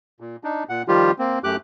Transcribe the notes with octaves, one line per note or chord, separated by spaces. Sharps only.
A#2
D4 D#4
A#2 F#5
D#3 F3 G3 F4 G4
A#3 C4
F#2 A3 G4 D6 F#6